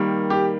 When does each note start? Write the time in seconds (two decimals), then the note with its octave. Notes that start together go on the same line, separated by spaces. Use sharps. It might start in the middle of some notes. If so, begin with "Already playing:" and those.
Already playing: D#3 G3 A#3
0.30 G4